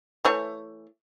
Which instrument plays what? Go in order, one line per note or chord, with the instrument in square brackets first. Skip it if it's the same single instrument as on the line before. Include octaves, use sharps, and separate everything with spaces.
[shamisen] E3 A3 C#5